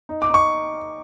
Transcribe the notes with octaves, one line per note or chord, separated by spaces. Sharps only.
D#4
D6
D#4 C#6